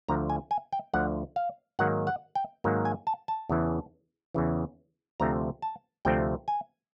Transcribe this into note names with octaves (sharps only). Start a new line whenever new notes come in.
D2 D3 F3 A#5
G#5
G#5
G5
D2 D3 F3 F#5
F5
G#2 D#3 F#3 A#3 F#5
F#5
G5
G#2 D#3 F#3 A#3
G#5
A5
A5
E2 C#3 E3
E2 C#3 E3
D2 C3 F3 A3 C4 A#5
A5
D2 C3 F3 A3 C4 G5
G#5